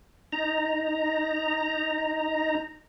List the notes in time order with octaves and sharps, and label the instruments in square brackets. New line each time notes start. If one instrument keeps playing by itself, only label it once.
[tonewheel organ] D#4 A#5